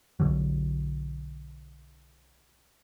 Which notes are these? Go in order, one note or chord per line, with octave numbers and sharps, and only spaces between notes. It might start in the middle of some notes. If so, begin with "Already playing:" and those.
B1 B2 D3 F#3